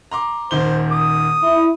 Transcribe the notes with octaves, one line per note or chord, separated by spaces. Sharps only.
A#5 C6 D6
D#1 D#3 C5 G7
D#6
E4